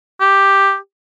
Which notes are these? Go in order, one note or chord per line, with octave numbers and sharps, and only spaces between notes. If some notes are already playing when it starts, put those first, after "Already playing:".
G4